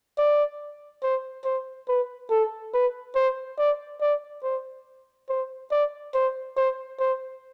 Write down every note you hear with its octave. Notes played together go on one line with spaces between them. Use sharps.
D5
C5
C5
B4
A4
B4
C5
D5
D5
C5
C5
D5
C5
C5
C5